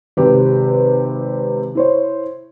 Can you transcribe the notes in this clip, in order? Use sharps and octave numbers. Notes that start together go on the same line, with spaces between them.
G#1 C3 G4 B4
E4 C5 C#5